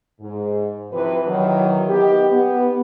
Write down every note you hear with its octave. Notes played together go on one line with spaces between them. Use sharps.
G#2
C3 E3 F3 B4
D#3 E3 F#3
B3 D#4 G4
B3